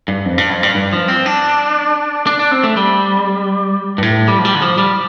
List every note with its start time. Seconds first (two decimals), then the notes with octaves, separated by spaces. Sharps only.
0.08 G2
0.25 F2
0.38 G2
0.50 F2
0.63 G2
0.75 G2
0.93 F3
1.09 C4
1.26 D4
2.27 D4
2.39 D4
2.51 C4
2.64 A3
2.77 G3
3.98 G2
4.03 A2
4.28 G3
4.39 F3
4.45 G3
4.55 D3
4.62 F3
4.78 G3